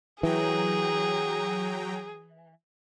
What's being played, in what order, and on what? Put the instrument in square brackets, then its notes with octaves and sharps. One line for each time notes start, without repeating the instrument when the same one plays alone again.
[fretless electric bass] E3 [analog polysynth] F#3 G5 A#5 [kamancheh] G#4